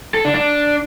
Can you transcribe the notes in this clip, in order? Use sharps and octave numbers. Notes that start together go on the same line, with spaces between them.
A4
D4
D4